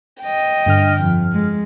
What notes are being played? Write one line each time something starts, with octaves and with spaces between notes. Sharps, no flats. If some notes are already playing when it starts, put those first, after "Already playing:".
D#5 G5
G2 D3 F6
F2
G#3